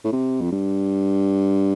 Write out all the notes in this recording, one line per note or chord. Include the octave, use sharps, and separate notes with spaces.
A2
C3
F2
G2